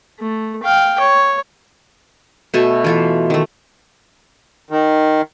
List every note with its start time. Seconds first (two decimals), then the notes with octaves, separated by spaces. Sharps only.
0.19 A3
0.63 F5 G5
1.00 C#5
2.54 B2 A3 A4 G#5
2.84 E3 F4 A4
3.30 D#3 A3
4.70 D#3